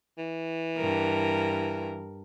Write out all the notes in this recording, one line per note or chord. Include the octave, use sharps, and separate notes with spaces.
E3
G2 A#4